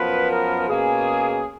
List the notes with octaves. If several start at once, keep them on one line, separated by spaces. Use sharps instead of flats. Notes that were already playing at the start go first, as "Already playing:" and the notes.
Already playing: F#2 F3 B3 B4
A#4
B2 A#3 C#4 G#4